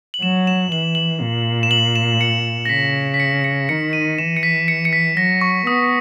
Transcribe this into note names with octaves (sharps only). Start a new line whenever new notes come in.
F#7
F#3 E7
E7
E3 F#7
F#7
A#2
E7
F#7
E7
C#7
A#6
C#3 B6
B6
C#7
C#7
D#3 C#7
D#7
E3 E7
C#7
B6
C#7
C#7
B6
F#3 A#6
C#6
B3 D#6